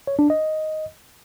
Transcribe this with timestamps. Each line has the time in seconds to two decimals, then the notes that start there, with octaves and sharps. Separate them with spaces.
0.07 C#5
0.19 D4
0.30 D#5